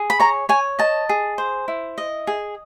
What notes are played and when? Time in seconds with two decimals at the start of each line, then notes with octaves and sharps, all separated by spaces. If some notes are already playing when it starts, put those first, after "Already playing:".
Already playing: G#4
0.10 B5
0.20 C#5 A#5
0.49 C#5 G#5
0.79 D#5 A5
1.09 G#4
1.38 C5
1.68 E4
1.98 D#5
2.27 G#4